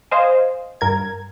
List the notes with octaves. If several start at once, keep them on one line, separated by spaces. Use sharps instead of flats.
C5 D#5 F5 G#5
G2 A#4 G#6